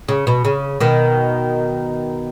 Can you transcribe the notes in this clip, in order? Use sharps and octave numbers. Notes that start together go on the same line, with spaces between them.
C#3
B2
C#3
B2 D#3